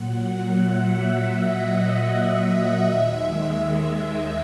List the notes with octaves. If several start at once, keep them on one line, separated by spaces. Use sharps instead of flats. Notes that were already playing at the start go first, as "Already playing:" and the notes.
Already playing: A#2 F#3 F#5
E5
D#5
E5
D#2 D#3 G#3
E5